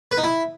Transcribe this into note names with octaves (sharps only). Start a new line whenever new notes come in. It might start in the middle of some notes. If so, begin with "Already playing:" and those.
B4
D#4
E4